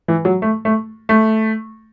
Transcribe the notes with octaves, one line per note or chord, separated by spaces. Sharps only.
E3
F#3
A3
A3
A3